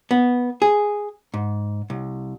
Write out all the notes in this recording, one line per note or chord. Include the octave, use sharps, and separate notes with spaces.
B3
G#4
G#2
C2